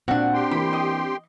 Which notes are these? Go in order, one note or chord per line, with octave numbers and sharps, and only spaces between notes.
A#2 C4 D4 F#4 F#5
G4 G5 C6
E3 A#3 B5
D#5